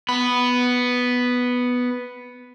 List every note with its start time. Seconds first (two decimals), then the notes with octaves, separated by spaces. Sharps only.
0.09 B3 B5